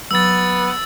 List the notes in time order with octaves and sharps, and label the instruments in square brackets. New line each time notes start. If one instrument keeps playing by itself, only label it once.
[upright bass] F#3 [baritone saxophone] B3 [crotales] E6 A6